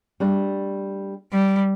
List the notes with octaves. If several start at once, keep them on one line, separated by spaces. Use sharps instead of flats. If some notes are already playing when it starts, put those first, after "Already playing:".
G3 A3 D4
G3